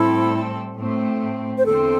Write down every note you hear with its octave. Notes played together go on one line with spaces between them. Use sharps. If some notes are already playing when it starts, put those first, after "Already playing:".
Already playing: A2 G3 C4 E4 A4
A2 A3 C4
C5
E2 D3 C4 A4